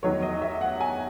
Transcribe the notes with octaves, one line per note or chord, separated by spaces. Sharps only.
E2 D#3 F#3 B3 C#5
D#5
E5
F#5
G#5